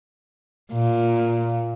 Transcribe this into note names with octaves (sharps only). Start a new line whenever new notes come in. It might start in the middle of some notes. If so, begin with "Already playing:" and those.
A#2